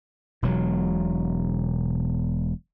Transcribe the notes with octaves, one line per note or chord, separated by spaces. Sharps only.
E1 B2 F#3